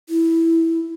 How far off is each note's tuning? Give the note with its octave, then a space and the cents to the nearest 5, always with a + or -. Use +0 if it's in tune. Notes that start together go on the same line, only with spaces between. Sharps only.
E4 -5